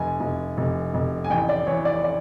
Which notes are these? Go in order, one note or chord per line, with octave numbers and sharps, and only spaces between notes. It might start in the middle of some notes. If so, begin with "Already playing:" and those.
Already playing: F1 G#5
F1
F1
F1
G#5
A1 G5
D5
E3 C#5
D5
D5